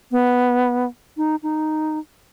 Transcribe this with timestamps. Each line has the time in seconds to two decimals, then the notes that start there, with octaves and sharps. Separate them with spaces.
0.11 B3
1.17 D#4
1.43 D#4